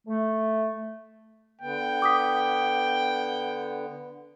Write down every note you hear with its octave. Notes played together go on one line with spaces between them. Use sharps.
A3
D3 B3 G5
D6 D#6 B6